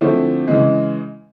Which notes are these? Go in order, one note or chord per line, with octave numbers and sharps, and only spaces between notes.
D3 F3 A3 C4 E4
C#3 E3 G#3